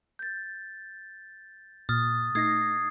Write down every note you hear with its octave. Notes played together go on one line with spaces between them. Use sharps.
G6 A6
A#2 D#6 F6 A6
A3 D#4 D#6 G#6 A#6 C7